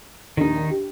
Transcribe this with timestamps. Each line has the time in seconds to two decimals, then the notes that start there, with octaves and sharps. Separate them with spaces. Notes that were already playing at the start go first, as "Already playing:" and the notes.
0.37 A#1 D#2 D#3 D#4
0.70 G4